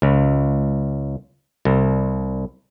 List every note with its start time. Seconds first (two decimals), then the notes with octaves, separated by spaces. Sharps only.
0.02 C#2
1.65 C2